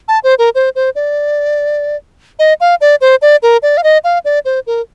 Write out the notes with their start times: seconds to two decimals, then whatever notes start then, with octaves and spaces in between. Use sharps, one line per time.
0.08 A5
0.24 C5
0.39 A#4
0.55 C5
0.75 C5
0.95 D5
2.39 D#5
2.61 F5
2.81 D5
3.01 C5
3.22 D5
3.43 A#4
3.63 D5
3.77 F5
3.84 D#5
4.04 F5
4.25 D5
4.45 C5
4.67 A#4